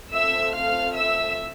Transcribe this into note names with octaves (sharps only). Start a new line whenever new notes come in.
A3 C4 F4 E5 E6
F5 F6
E5 E6